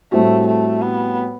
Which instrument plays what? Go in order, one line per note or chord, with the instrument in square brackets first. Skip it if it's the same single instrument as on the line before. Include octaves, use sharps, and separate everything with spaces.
[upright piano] A2 G3 C4 F#4 [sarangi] A3
[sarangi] A3
B3